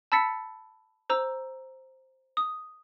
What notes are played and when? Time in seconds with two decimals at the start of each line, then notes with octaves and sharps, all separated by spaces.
0.12 A5 B5 E6 A6 B6 C#7
1.10 C5 A#5 E6
2.37 D#6